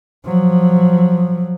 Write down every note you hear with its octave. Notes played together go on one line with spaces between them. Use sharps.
F3 F#3